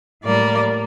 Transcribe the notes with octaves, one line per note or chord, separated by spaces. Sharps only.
A2 G3 A#3 D5